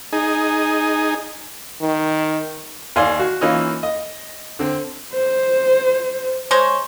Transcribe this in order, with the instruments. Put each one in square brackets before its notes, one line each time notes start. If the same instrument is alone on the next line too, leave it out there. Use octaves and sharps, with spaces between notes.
[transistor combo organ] D#4 G#4
[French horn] D#3
[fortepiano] D#2 D5 F5 G#5 C6
F#4
E3 A#3 C#4 D#4 F4
D#5
D3 C4
[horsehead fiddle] C5
[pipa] G#3 C5 C#5